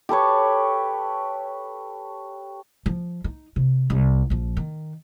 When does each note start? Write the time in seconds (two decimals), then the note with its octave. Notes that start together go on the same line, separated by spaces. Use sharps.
0.09 G4 A4 B4 C#5
2.86 F3
3.24 D#4
3.56 C3
3.90 C2
4.30 A#1 F3
4.57 D#3